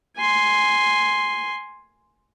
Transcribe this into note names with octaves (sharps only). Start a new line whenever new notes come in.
G#5 C6